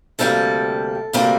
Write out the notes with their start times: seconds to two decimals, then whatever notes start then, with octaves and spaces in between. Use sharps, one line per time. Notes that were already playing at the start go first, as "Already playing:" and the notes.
0.19 D2 C3 G3 A#3 A4
1.13 D2 C3 G3 A#3